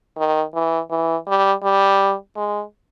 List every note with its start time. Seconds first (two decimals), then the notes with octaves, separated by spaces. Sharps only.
0.17 D#3
0.54 E3
0.90 E3
1.27 G3
1.63 G3
2.36 G#3